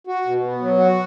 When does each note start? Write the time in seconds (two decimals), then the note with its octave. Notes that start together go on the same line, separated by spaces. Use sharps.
0.07 F#4
0.26 B2
0.43 B3
0.61 F#3
0.78 F#4